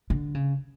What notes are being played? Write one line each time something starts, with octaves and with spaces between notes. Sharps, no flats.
D3
C#3